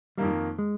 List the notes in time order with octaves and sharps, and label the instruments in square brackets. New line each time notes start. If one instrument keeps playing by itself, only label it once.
[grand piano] F2 D#3 A#3 [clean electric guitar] G3
[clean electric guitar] G#3